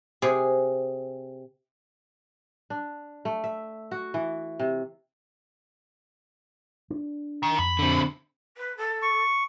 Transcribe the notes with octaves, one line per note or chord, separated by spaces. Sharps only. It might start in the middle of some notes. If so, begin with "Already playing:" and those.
C3 G#4
D4
A3
E5
F#4
E3
C3
D4
D#3
F2 B5
D3 C4
B4
A4
C#6